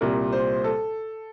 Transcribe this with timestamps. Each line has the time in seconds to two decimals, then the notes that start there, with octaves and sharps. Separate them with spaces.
0.01 C2 A#2 G3 A#4
0.32 C5
0.64 A4